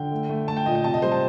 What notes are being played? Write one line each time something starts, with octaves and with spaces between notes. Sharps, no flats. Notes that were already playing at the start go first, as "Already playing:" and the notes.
Already playing: D3 G5
A3
A3
A3 A5
G5
A#2 D#5
G5
C3 A5
D#5
G3 C5
A5